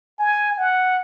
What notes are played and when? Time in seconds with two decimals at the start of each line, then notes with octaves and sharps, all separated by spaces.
0.19 G#5
0.58 F#5